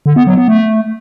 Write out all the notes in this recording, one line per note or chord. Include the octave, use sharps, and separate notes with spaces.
D3
B3
F#3
B3
A3